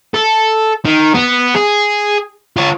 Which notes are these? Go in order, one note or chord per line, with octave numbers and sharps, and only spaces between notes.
A4
D#3
B3
G#4
F4 C#5